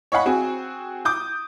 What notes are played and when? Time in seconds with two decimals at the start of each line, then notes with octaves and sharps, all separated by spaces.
0.12 C#5 D#5 F5 F#5 B5
0.26 C4 F#4 G#4
1.05 D6 D#6 G6